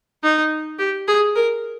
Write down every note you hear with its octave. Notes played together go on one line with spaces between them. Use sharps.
D#4
G4
G#4
A#4